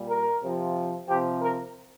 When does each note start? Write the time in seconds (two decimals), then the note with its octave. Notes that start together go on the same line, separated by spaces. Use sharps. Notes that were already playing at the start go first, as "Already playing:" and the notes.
Already playing: A#2 G3
0.10 A#4
0.42 C3 F3
1.07 C3 F3 G4
1.40 A#4